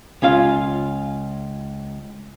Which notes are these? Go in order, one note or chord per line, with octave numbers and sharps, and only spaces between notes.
C#2 C#4 F4 F5